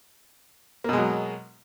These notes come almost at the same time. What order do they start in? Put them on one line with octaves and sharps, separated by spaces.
A#3 B2 G#3 F#3